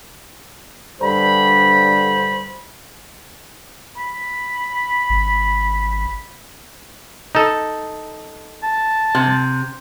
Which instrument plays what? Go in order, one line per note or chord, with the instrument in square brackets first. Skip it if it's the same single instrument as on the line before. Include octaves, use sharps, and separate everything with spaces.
[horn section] G2 D3 C5 B5
[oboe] B5
[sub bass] G#1
[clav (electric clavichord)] D#4 A4
[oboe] A5
[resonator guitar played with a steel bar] C3